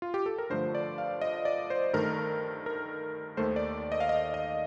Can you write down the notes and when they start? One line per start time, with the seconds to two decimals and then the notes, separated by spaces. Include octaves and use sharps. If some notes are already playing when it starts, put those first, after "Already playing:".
0.02 F4
0.14 G4
0.26 A4
0.38 A#4
0.50 G2 D3 F3 A3 C5
0.75 D5
0.98 F5
1.21 D#5
1.45 D5
1.70 C5
1.93 G2 D#3 A3 A#4
2.66 A#4
3.37 D#2 D#3 A3 C5
3.56 D5
3.92 D#5
4.00 F5
4.09 D#5
4.34 D#5